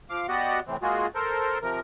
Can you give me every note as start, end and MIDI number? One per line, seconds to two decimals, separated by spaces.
0.10 0.26 53
0.10 0.26 77
0.10 0.26 86
0.29 0.60 59
0.29 0.60 66
0.29 0.60 67
0.29 0.60 74
0.29 0.60 75
0.29 0.60 78
0.67 0.77 45
0.67 0.77 48
0.67 0.77 52
0.67 0.77 60
0.82 1.07 56
0.82 1.07 58
0.82 1.07 65
0.82 1.07 66
0.82 1.07 68
1.15 1.59 69
1.15 1.59 70
1.15 1.59 72
1.62 1.80 48
1.62 1.80 53
1.62 1.80 70